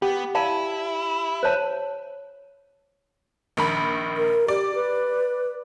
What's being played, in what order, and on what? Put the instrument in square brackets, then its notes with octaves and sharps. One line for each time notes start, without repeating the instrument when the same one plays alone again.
[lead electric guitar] B3 [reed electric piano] G4
[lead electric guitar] E4 [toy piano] D5 F5 A5
[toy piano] C5 C#5 A5
[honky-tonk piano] A#1 D#3 B5
[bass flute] A#4
[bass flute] G4 [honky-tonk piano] D5
[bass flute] B4